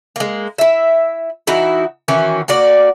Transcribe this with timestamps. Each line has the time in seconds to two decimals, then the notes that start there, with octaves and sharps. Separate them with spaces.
0.16 G#3 A#3
0.58 E4 E5
1.47 E3 D#4 E4 F#4
2.08 D#3 E3 C#4 F#4
2.48 A#3 F#4 D5